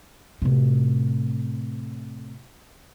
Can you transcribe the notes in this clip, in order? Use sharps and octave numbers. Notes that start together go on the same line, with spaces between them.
A2 C3